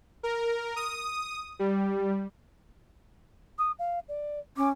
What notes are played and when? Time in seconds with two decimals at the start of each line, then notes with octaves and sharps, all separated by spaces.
0.23 A#4
0.76 D#6
1.59 G3
3.58 D#6
3.79 F5
4.08 D5
4.57 C#4 D6